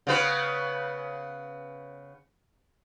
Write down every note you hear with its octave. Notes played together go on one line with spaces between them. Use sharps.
C#3 B3 B4